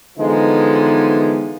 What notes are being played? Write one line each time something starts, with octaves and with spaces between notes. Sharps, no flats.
D3 E3 F3 G#3 B3 D#4